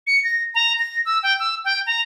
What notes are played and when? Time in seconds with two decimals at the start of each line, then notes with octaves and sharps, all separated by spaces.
0.07 C#7
0.24 A#6
0.55 A#5
0.79 A#6
1.05 E6
1.23 G5
1.39 E6
1.65 G5
1.86 A#5